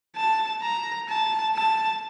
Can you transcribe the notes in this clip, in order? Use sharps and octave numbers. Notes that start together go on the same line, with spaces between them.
A5
A#5
A5
A5